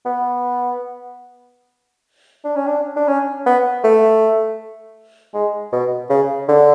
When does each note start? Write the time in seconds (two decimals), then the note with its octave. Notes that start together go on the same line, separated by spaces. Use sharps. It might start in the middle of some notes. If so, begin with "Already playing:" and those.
0.06 B3
2.45 D4
2.56 C#4
2.67 D4
2.96 D4
3.08 C#4
3.46 B3
3.84 A3
5.34 G#3
5.72 B2
6.10 C#3
6.49 D3